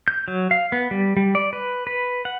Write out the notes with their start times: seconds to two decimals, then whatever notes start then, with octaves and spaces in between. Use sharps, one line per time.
0.08 G6
0.28 F#3
0.51 F5
0.72 B3
0.91 G3
1.17 G3
1.35 D5
1.53 B4
1.87 B4
2.25 F#5